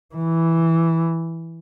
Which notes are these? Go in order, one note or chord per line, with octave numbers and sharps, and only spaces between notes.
E3